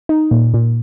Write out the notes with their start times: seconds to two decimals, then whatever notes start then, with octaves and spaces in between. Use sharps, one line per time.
0.09 D#4
0.31 A#2
0.54 A#2